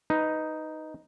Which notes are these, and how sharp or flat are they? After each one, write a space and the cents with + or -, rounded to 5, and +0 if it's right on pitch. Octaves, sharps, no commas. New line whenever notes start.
D#4 +0 B4 +5